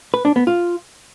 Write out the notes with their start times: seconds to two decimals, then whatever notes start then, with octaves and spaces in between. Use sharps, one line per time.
0.14 B4
0.25 D4
0.36 B3
0.47 F4